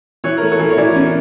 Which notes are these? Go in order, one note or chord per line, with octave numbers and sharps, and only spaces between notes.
E3 C#5
A3 A#4
A4 C#5
E3
C#5
E3 A#4 D5
C#4